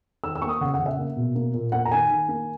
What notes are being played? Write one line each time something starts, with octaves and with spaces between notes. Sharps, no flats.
D#3 E6
E6
A#3 C#6
D#6
C#3 F#5
F#5
C#3
E5
A#3
B2
A#3
A#2
A#3 F#5
A#5
D#3 G#5
D#3
A#3